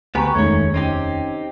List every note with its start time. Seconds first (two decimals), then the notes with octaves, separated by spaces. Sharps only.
0.15 D2 B3 G4 B4 G#5 A#5 C#6
0.35 F1 D#2 D#3 G#3 A3 C#4 C#5 G#6
0.74 C4 C#4 D#4 G4